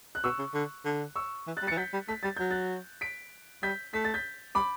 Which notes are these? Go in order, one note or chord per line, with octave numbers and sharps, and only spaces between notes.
F#6
B2 C#6 E6
C#3
D3
D3
C#6 E6
E3
F#6 A6
G3
E3 A6 C#7
F#3 G6 B6
G3
A3 B6
G3 A6
F#3 G6
F#6 A6
B6 D7
G3 G6 B6
A3 B6
A6
G6 B6
G3 B5 D6